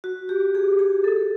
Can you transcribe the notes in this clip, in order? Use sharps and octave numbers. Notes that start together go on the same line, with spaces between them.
F#4
G4
G#4
G#4
A4